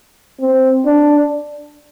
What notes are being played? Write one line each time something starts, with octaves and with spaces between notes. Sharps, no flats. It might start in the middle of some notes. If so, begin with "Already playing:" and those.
C4
D4